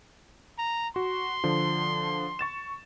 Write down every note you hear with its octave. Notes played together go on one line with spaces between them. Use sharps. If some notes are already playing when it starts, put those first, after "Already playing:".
A#5
F#4 C6
D3 F3
C#6 A6 E7